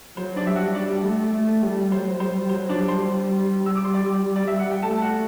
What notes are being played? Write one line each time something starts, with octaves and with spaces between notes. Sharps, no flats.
F#3 C5
D4 D5
G3 E5
F#4 F#5
G3 D4 D5
A3
A3
G3
F#3 C5
G3 C5
F#3 C5
D4 D5
G3
C5 C6
G3
G3 E6
D6
C6
D5 D6
D5
E5
F#5
G5
A3 A4 A5
F#4 F#5